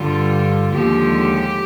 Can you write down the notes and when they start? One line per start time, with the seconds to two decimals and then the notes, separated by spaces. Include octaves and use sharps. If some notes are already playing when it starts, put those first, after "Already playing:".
Already playing: G2 D3 G3 F4
0.72 D#2 D3 F3 G#3 G4